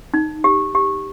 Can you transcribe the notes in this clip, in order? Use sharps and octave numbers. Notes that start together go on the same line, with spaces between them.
D#4
G4
G4